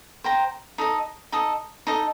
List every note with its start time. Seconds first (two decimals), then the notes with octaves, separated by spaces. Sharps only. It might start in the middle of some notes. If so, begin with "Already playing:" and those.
0.24 C5 G5 A#5
0.78 D#4 A4 D#5
1.32 D#4 A4 D#5
1.87 D#4 A4 D#5